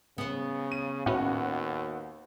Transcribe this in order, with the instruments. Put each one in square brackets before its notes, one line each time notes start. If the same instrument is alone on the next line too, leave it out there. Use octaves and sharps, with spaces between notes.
[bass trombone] C#3 [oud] B3 C5
[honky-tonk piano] D#7
[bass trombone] D#2 [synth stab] A2 C#4 [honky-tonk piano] F#4 B4 F#5